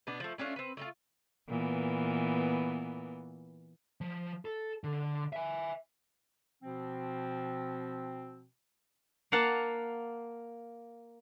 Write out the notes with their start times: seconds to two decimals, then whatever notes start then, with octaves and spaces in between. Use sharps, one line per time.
0.07 B2 B3 D4
0.20 F3 A3
0.38 A3 C#4 D4 F4
0.56 C4 B4
0.77 A3 D#4 F4
1.49 A#2 E3 B3
4.01 F3
4.45 A4
4.84 D3
5.33 E5 G#5
6.62 B2 F3 C4
9.32 A#3 F5 F#5 A5